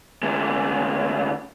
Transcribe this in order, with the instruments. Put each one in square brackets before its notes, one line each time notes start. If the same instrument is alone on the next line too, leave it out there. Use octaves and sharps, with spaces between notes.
[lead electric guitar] D2 G#3